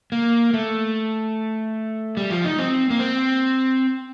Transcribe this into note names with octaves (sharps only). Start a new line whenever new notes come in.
A#3
A3
G3
F3
D#4
C4
A#3
C4